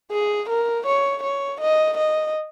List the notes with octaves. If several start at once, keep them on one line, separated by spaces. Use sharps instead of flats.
G#4
A#4
C#5
C#5
D#5
D#5